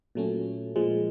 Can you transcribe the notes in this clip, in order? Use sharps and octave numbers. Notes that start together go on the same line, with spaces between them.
A#2 F#3 A3 C#4
A#2 F3 G#3